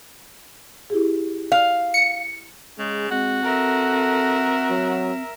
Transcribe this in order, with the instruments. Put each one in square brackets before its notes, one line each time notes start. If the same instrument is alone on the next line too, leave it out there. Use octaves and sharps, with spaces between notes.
[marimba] E4 G4 G#4
[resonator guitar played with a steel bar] F5
[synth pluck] C#7
[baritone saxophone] C#3 [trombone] G#3
[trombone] G#3 [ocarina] C4 [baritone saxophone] F#4
[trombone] A4 [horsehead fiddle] A#4 E5
[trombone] F#3